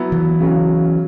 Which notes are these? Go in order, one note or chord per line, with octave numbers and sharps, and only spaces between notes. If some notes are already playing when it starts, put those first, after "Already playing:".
Already playing: F#3 B3 E4
E3
C#3 F#3 C#4